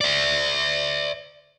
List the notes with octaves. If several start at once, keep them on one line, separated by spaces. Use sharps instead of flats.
D5 E5